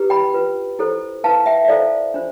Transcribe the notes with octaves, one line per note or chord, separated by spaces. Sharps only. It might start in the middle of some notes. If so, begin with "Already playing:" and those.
Already playing: E4 G4 B4
G5 B5
F4 B4
E4 A4 C5
E4 B4 F5 A5
E5 G5
E5
E4 A4 C5 D5 F5
D4 F4 C5